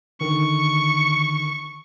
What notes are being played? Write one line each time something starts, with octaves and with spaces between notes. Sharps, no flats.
D3 D#3 C#6